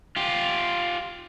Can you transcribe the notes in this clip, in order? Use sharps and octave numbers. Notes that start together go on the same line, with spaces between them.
F4 G4